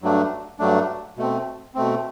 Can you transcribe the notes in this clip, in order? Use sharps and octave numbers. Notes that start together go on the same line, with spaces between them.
G2 F#3 A3 D4
G2 F#3 A3 D4
B2 A3 C4
B2 A3 C4